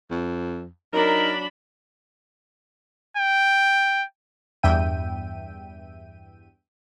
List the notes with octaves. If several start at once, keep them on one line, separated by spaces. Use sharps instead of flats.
F2
F#3 D4 D#4 A#4 B5
G5
E2 G2 E5 G5 D#7